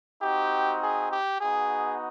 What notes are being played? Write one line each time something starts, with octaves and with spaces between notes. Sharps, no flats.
C4 D#4 F#4 G4
G#4
G4
B3 D#4 F#4 G#4